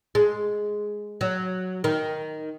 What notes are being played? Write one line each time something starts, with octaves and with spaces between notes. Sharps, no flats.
G#3
F#3
D#3